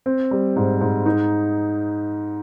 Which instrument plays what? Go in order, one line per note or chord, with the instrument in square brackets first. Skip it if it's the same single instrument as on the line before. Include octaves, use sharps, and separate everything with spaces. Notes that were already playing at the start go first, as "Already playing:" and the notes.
[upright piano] C4
G3
G#2
G#2
D#4